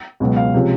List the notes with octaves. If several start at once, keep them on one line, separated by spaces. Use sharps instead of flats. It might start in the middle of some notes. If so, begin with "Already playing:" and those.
C#2 B2 F#3
F5
C3 F3 G#3 C#4